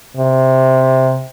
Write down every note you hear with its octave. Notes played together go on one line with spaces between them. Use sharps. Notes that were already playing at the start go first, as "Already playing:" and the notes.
C3